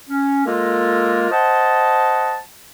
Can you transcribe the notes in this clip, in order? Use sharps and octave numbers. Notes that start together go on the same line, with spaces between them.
C#4
G#3 A#3 F4 A4 A#4
C5 D#5 F#5 A5